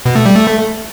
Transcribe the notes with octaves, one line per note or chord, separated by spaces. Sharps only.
B2
A3
G3
A3